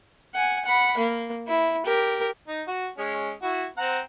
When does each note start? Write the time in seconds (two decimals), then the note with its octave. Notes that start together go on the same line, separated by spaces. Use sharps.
0.35 F#5 G#5
0.65 F#5 B5
0.98 A#3
1.48 E4
1.85 G4 A#4
2.48 D#4
2.67 F#4
2.98 G#3 C#4
3.42 E4 F#4
3.78 C4 F#5 A#5